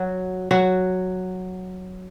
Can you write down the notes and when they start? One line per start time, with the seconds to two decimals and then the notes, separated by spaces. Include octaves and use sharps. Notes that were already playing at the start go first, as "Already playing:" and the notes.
Already playing: F#3 F#4
0.51 F#3 F#4